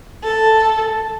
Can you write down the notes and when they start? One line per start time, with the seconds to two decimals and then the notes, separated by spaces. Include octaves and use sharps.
0.24 A4